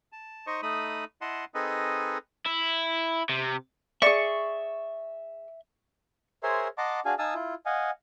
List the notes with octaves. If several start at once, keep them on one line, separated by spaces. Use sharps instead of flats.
A5
D#4 C5 D#5 C#6
A3 D#4 B5 D#6
E4 D#5 F#5 A5 C6
C4 D#4 G#4 A4 B4 D#5
E4
C3
G#4 D5 E5 C#6
G#4 A#4 C5 C#5 E5 C6
D#5 F#5 A5 A#5 C6 D6
D4 F#4 G#4 F5 G#5
D#4 F5 G#5 A5 D#6 E6
E4 F4
D#5 F5 F#5 G#5